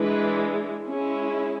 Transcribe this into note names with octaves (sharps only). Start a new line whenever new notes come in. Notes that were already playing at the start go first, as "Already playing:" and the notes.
Already playing: E3 G#3 D4 B4
G#3 C#4 E4